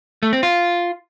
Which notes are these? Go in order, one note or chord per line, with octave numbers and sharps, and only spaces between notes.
A3
C4
F4